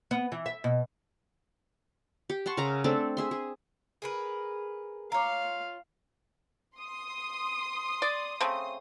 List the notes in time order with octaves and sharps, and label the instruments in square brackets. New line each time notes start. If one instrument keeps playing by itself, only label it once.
[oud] B3
E3
E5
B2
[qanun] G4
F#5 A5 C6 C#6
C#3 A#4 E5 A#5
A3 C4 D4 A4
G#4 E5 C6
G#4
[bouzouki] G#4 A#4 B4
[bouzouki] F4 C#5 [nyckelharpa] F5 [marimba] A#5 D6
[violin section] C6 D#6
[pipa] D5
C#3 A3 C4